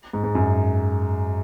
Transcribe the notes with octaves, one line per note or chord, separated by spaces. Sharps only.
G#2
G#2
F#2